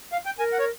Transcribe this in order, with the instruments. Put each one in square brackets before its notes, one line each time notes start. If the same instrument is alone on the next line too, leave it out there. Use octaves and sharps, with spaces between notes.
[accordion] F5
G5
[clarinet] A#4 [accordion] G#5
[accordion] F#5
C#5